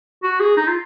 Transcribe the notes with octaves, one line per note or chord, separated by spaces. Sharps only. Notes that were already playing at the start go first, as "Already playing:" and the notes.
F#4
G#4
D#4
F4